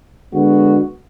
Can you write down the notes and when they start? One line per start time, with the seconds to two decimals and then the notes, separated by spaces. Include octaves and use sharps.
0.33 D3 G#3 B3 F#4